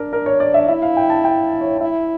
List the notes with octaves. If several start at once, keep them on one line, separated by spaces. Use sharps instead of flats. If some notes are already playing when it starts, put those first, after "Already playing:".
Already playing: D4 A#4
A#4
C#5
D5
E5
E4 E5
F5
G5
A5
G5
C#5
E4 E5